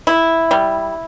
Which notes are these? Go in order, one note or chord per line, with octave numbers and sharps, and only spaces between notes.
E4
G3